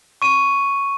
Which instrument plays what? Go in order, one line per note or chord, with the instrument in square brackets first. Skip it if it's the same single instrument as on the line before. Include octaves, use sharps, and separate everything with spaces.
[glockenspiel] C#6 D#7